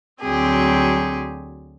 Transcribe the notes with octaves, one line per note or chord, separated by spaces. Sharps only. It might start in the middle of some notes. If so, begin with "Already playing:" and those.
D2 F#3 C4 G4 G#4